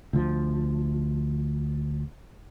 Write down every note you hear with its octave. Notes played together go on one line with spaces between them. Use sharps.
D2 F3